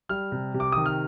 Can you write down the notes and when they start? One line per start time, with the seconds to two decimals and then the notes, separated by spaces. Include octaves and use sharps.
0.09 G3 F6
0.32 C3
0.54 C3
0.60 D6
0.72 D#3 D#6
0.86 F6